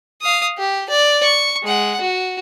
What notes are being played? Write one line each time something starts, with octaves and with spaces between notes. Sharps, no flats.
F5 D#6
G4
D5
C#6
G#3 F#5
F#4